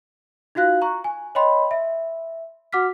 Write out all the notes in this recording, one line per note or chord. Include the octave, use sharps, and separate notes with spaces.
D#4 F4 F#4 F5 F#6
A#5 C#6
G#5
C#5 D#5 G5 B5 C6
E5
F#4 F#5 D6 F6 B6